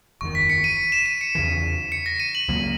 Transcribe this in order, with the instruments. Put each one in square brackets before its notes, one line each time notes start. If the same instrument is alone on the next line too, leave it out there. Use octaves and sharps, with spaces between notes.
[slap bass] F#1 E2 D#3 [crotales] C#6
[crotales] B6
C#7
D#7
E7
D#7
C#7
[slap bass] E2 C#3 E3
[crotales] C#7
A#6
D#7
F#7
[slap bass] C#2 C#3 F#3 A#3